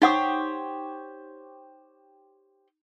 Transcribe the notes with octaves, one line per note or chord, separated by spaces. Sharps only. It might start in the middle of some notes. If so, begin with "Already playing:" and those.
D#4 G4 C5 C#5 F#5 D#6